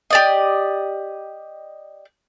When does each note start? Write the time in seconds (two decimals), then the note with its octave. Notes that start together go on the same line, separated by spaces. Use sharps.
0.10 G4 D5 D#5